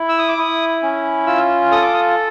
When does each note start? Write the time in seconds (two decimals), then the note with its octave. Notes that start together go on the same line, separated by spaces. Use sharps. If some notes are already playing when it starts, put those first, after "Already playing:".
Already playing: E4
0.09 E6
0.18 D#6
0.29 D6
0.38 E4 D#6
0.83 C#4
1.26 F4 E6
1.71 A4 D#6
1.82 D6
1.93 D#6